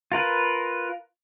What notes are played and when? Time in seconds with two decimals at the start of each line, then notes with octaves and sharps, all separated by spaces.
0.12 F4 A#4 B4